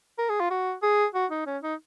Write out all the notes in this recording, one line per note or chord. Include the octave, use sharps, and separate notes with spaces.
A#4
G#4
F4
F#4
G#4
F#4
D#4
C#4
D#4